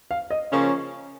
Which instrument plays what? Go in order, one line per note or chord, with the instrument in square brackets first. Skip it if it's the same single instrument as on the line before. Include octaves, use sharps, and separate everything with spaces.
[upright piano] F5
D#5
[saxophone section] C#3 F3 A#3 C#4